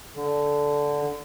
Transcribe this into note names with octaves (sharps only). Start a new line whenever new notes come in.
D3